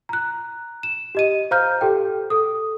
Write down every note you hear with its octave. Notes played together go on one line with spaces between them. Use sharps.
A#5 F#6
E7
G4 D#5 D#7
C5 F5 A#5 F6 G6
G4 A4 G5
A4 D#6